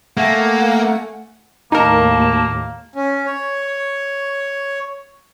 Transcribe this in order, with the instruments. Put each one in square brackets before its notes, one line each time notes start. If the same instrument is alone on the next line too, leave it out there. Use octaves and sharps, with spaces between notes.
[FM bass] A3 [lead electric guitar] A#3 [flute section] F#5 G#5
[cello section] D#2 A2 [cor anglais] A#3 [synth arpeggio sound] D#4 A#4 [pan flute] A5
[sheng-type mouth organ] C#4
C#5